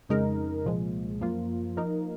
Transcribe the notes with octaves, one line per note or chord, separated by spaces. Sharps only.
F2 C#3 G#3 D#4 A#4
C2 A#2 F3 G#3
F#2 F3 A#3 F4
F3 A#3 D#4 A#4